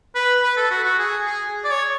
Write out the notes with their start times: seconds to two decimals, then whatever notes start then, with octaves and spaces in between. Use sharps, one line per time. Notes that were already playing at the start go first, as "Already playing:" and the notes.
0.15 B4
0.43 B4
0.57 A4
0.71 F#4
0.84 F#4
0.99 G#4
1.25 G#4
1.65 D5
1.71 C#5